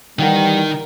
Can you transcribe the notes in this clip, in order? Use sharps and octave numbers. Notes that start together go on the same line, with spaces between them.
D#3 E3 G3 D#4 A#4 F#5 G5